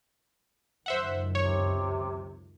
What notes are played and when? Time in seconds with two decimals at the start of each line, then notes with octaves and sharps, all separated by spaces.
0.86 C#2 F#2 D#3 C5 E5 F#5
1.35 C3 C#5